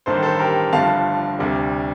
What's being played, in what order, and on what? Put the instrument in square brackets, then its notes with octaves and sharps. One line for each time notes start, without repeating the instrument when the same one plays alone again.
[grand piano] A1 G2 D#3 A#3 A4 C5
A4 C5
G4 A#4
G1 G2 D3 F3 A3 F5 A5
D2 C3 G3 D4